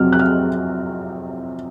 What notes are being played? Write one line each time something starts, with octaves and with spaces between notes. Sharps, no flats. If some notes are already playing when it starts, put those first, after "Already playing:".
Already playing: F2 C3 F#3 F6
F#6
F6